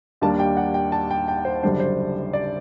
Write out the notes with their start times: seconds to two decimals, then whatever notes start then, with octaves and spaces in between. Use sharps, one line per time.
0.21 D#2 D#3 G3 A#3 D4 A5
0.40 G5
0.57 F#5
0.74 G5
0.92 A5
1.11 G5
1.28 G5
1.45 C5
1.63 F#1 F#2 D3 G3 D4 C5
1.80 C5
2.33 D5